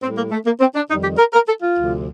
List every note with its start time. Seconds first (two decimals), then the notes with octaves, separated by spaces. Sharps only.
0.03 A2 G3 C4
0.18 A#3
0.31 A3
0.46 A#3
0.61 C4
0.75 D4
0.90 F2 D#3 G3 D#4
1.04 G4
1.18 A#4
1.34 A#4
1.48 A4
1.62 F4
1.77 D2 C3 F3